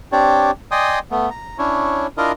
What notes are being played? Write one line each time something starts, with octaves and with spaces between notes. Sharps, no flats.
C4 D4 G4 C#5 D5
D5 D#5 G5 G#5 C6 D#6
A3 B3
A#5
C#4 D4 E4 C#5
D4 E4 F4 A#4 D#5 A#5